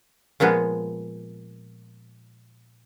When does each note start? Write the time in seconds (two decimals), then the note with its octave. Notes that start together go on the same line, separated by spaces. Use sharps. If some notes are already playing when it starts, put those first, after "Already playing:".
0.40 A#2 F3 G#3 B3